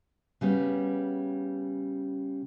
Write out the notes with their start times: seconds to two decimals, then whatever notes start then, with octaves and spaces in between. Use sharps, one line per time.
0.41 C#3 G3 B3 C#4